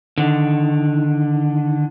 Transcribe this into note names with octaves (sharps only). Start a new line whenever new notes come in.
D3 D#3